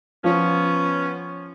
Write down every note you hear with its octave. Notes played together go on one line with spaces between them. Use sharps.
F3 B3 C#4